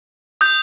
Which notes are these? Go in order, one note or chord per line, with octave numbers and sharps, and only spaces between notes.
D#6 G6